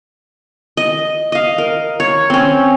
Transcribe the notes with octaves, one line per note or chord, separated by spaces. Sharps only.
D#5
D#5 F5
A#4
C#5
C4 C#4